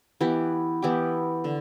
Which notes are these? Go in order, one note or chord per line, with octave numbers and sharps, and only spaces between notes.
E3 B3 E4 G4
E3 B3 E4 G4
D3